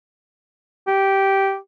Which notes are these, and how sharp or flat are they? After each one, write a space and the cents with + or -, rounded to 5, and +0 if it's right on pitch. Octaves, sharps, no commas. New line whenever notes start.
G4 -10